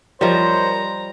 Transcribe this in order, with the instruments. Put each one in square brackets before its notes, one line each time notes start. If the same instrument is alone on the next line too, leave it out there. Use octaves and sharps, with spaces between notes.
[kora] F3 G3 [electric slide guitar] A#4 C#5 D#5 [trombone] C5 [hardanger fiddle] A#5